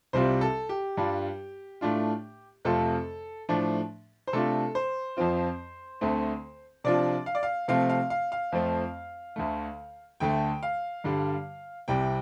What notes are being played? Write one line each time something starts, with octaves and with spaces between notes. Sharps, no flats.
C2 C3 G3 F4 C5
A4
G4
G2 G3 D4 F4
A2 A3 D4 F4
F2 C3 A3 F4 A4
A2 F3 A3 D4
C5
C3 A3 D4 F4 A4
C5
F2 F3 C4 F4
D2 D3 A3 C4
C3 F3 D4 F4 D5
F5
D5
F5
C3 F3 A3 C4 F5
F5
F5
F5
F2 F3 A3 C4
D2 D3 A3
D2 D3 A3 G5
F5
G2 D3 G3
C2 C3 G3 G5